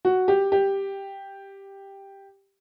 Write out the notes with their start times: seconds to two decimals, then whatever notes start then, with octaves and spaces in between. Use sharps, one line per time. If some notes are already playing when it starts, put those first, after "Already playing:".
0.05 F#4
0.28 G4
0.52 G4